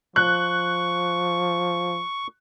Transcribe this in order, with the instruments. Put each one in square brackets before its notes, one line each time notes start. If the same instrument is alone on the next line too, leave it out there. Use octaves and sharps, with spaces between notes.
[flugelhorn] F3 [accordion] C#6 [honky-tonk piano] F#6